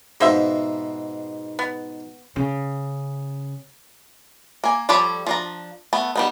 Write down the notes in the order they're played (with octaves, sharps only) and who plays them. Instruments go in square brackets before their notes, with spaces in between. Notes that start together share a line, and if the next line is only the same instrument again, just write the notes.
[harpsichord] G#2 B2 [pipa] A#3 C5 E5
[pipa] B3
[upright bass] C#3
[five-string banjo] A#3 G#5
F3 G3 G4 A4 C#5
F3 D4 A#5
A3 B3
G3 B3 D#4